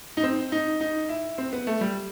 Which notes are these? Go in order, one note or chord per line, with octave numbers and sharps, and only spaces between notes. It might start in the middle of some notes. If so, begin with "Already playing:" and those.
D#4
C4
D#4
D#4
E4
C4
B3
A3
G3